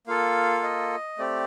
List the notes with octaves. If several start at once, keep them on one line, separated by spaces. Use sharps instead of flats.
A#3 F4 A4 F5
D#5
A3 C4 G4 D5